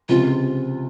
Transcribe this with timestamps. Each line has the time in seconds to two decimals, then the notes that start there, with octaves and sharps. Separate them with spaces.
0.09 C#2 C3 F3 F4